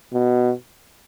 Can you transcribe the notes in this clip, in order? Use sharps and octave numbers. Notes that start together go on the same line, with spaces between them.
B2